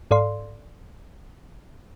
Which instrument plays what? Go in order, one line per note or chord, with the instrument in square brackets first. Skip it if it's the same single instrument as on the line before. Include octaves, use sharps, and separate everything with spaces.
[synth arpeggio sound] G#2 A4 D5 F5 C6